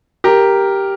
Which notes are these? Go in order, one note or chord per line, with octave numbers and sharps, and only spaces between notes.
G4 A#4